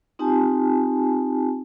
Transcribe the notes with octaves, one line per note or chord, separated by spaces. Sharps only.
C4 D#4 F4 G4 G#5 A5